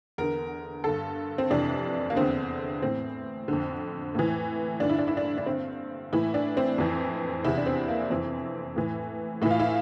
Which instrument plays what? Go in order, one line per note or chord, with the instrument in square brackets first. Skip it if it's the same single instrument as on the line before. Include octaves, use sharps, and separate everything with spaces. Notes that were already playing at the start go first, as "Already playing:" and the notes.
[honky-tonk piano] E2 D3 A#4
G2 D3 A4
C4
F2 C3 E3 D4
A#3
E2 D3 C4
A2 E3 C4
F2 D3
A2 E3
G2 D3 D4
E4
D4
E4
D4
D4
G2 D3 C4
A2 E3 E4
D4
C4
F2 E3
E2 C3 E3 E4
D4
C4
A#3
F2 E3 C4
A2 E3
A2 E3 E4
F4
E4